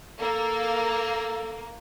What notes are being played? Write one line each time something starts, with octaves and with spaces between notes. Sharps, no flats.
A#3 A4